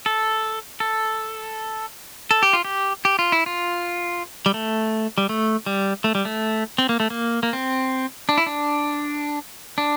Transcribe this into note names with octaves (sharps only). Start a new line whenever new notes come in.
A4
A4
A4
G4
F4
G4
G4
F4
E4
F4
G3
A3
G3
A3
G3
A3
G3
A3
C4
A#3
A3
A#3
A#3
C4
D4
E4
D4
D4